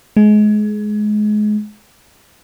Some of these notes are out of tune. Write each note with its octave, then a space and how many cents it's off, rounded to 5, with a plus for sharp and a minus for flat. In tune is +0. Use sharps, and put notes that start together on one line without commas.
G#3 +25